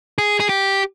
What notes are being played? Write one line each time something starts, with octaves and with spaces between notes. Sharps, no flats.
G#4
G#4
G4